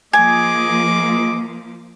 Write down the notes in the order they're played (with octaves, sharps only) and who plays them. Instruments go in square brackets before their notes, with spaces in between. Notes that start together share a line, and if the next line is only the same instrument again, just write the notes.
[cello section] F3 A#3 [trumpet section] G#4 D#5 D6 [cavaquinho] G#5